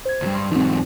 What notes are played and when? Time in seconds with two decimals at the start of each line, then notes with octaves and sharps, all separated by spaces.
0.05 C5 G#6
0.22 C#2 G2
0.35 C6
0.51 E2 G#2 C4 D#4